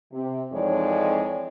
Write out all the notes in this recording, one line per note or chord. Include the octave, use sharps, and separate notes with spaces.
C3
F2 E3 G#3 D#4 C#5 D5